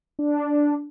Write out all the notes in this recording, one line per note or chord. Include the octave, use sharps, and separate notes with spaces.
D4